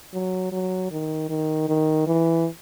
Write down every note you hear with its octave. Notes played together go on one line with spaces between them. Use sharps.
F#3
F#3
D#3
D#3
D#3
E3